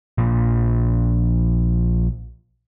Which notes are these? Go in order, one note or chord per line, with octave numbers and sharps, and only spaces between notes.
A#1 A#2